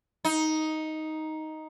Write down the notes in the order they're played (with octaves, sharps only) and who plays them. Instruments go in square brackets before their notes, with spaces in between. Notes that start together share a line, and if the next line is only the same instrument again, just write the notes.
[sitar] D#4